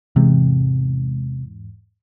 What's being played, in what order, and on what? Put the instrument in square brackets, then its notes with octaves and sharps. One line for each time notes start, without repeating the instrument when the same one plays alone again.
[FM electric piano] E2 G#2 [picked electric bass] C3